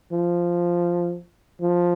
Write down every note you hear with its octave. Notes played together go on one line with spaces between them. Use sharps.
F3
F3